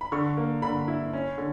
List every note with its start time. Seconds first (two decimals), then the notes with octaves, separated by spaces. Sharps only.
0.01 B5
0.12 D3 C#6
0.37 A#3
0.62 D3 B5
0.88 E4
1.13 C#4
1.38 D3